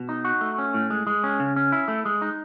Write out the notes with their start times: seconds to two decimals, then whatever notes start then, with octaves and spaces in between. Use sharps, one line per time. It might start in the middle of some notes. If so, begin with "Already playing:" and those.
Already playing: B2
0.09 D#4
0.25 F#4
0.41 A3
0.58 C#4
0.74 A2
0.90 G#3
1.07 G#3
1.24 C#4
1.40 C#3
1.56 C#4
1.72 E4
1.88 A3
2.05 G#3
2.22 D#4